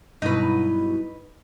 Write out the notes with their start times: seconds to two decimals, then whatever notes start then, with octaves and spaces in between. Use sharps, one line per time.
0.22 G2 B2 F#3 D#4 E4 B4